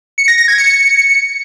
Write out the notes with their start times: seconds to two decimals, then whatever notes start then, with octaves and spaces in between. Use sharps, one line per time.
0.18 C#7
0.28 A#6
0.38 A#6
0.48 G#6
0.58 C#7